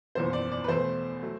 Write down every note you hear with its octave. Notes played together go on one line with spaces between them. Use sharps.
F#1 E2 B2 C5
D5
D5
B4
E2 B2 A3 C5
F#3 A3